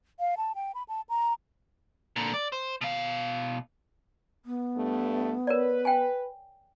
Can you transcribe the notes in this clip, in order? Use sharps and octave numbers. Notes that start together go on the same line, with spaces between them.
F5
A5
G5
B5
A5
A#5
A#2 D3
D5
C5
B2 F5
B3
G2 A3
A#4 B4 C#5 D5
G5 G#5